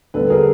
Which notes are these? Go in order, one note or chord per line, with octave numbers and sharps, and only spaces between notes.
D3 G3 B3 A4 B4
G#4 A#4